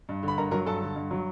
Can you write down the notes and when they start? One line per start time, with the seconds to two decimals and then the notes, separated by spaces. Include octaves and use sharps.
0.09 G2
0.23 D3
0.28 B5
0.38 G2 A#4 A#5
0.51 F#3 A#4 A#5
0.66 G2 A4 A5
0.82 D3
0.96 G2
1.11 F#3